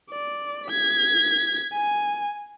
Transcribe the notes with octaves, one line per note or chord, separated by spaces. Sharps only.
D5
G#6 B6
G#5